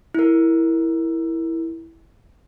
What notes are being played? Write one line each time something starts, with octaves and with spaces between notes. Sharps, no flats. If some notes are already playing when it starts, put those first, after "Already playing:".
E4 A#4